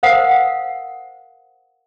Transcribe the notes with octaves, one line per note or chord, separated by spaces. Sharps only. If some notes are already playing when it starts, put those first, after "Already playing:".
A#4 C5 F5 F#5 D#6